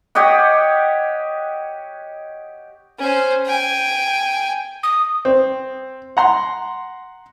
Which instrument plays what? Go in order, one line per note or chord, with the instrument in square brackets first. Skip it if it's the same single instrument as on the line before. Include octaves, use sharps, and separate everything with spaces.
[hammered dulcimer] G4 C#5 D#5 F#5
[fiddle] C#4 C5
G5 G#5
[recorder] D#6
[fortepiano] C4
F#5 A#5 C6